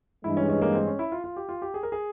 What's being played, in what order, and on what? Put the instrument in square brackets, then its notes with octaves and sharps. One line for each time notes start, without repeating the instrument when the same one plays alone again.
[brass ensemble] G2 E3 G#3 [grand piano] E4
[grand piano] C#4
C#4
A#3
C4
C#4
E4
F4
F4
G4
F4
G4
G#4
A#4
G#4